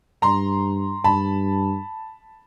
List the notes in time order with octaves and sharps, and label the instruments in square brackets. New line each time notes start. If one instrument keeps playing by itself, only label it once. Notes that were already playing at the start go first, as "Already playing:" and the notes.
[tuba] G2 [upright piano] A#5 C6
[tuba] G2 [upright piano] A5 B5